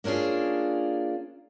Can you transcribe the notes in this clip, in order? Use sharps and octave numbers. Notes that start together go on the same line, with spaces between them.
A#3 C#4 D4 F4 G#4